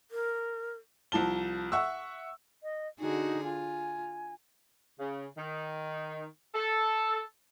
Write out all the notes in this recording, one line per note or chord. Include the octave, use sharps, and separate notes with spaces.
A#4
C2 F3 A5 G7
E5 F#5 C#6 E6
D#5
D3 D#4 F#4 G#4
F4 G#5
C#3
D#3
A4